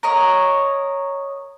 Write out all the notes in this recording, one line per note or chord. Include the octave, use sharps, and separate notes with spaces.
A#4 C#5 D#5 C#6